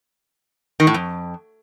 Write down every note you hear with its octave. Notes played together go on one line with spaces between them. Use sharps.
D#3
A2
F2